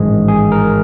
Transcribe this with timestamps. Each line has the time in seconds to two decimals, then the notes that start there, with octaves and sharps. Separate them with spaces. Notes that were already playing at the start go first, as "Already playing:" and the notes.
Already playing: A1 G#2 D#3 G#3 G#4
0.28 G#4
0.52 A#4